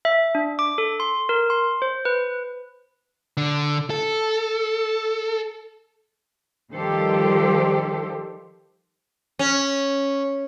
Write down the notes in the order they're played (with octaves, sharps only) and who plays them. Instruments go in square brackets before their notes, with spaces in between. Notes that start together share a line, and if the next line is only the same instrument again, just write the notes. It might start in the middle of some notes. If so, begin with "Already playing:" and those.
[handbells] E5
D4
D6
A4
C6
A#4
C6
C5
B4
[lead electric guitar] D3
A4
[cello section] D#3 F3 G3 G4 A4 C5
[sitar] C#4